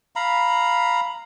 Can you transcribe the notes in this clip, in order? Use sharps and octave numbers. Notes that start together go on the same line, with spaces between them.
F5 A#5 B5